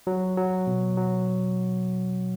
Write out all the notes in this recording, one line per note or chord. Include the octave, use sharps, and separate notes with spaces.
F#3
F#3
B2
F#3